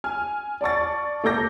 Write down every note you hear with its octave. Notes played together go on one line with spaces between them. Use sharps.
G#5 F6
D5 A5 C#6 A6
A#3 A4 D6 G6 A#6